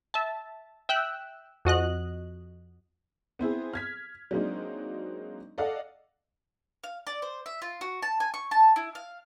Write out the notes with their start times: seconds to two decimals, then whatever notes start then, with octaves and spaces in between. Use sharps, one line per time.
0.14 E5 A5
0.89 E5 G5 E6 F#6
1.65 F2 F#4 D#5 F#6
3.39 B3 C4 E4 G#4
3.73 F6 G#6 B6
4.31 F#3 G#3 A#3 C4 D4 D#4
5.58 A4 D5 D#5 F5 F#5
6.84 F5
7.07 D5
7.22 C5
7.46 E5
7.62 F4
7.81 F#4
8.02 A5
8.20 G#5
8.34 C#6
8.51 A5
8.76 E4
8.95 F5